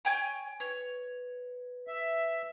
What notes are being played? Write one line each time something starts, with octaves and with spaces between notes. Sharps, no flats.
C#5 G5 G#5
B4 C#5
E5